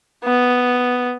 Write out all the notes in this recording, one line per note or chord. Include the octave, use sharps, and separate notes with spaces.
B3